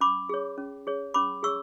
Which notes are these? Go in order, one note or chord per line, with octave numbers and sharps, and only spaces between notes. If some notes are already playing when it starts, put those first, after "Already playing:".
C#4 B5 D6
G#4 C#5
C#4
G#4 C#5
C#4 B5 D6
G#4 C#5 C#6 E6